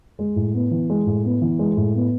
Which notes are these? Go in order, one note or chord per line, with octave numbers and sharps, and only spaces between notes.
G#3
A2
B3
E3
G#3
A2
B3
E3
G#3
A2
B3